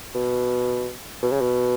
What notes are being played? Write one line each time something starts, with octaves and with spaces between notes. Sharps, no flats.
B2
B2
C#3
B2